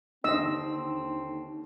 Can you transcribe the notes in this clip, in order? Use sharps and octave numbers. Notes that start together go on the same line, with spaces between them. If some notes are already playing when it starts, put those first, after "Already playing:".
D#2 D3 C4 D#5 E6